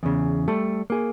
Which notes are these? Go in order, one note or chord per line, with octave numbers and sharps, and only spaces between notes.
E2 C#3
G3 A3 A4
A#3 G#4